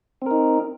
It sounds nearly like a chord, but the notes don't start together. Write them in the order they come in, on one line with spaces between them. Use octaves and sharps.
C4 A#4 D#4